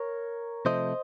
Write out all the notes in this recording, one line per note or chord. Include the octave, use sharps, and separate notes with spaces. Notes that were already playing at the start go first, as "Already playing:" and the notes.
Already playing: A#4 C#5
C3 F3 A3 C5 D#5